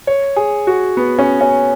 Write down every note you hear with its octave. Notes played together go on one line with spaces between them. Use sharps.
C#5
G#4
F#4
B3
C#4
C#4